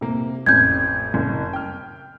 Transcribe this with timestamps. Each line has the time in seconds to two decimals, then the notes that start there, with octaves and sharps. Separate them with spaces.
0.01 C3 A#3
0.46 A1 F2 G6 G#6
1.14 F#1
1.53 G5 F6